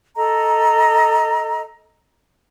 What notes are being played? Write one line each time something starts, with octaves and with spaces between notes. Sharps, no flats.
A4 D#5 A#5